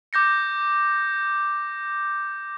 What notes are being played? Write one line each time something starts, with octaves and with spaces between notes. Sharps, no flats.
D6 G6 A#6 C#7